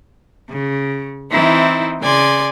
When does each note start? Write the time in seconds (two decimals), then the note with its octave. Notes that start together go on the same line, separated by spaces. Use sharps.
0.49 C#3
1.32 E3 C4 D#4 E4
2.01 C#3 D5 G#5 C6